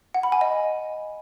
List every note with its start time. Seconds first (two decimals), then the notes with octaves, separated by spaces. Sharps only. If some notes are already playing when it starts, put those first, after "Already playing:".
0.14 F#5
0.23 B5
0.32 G#5
0.41 D#5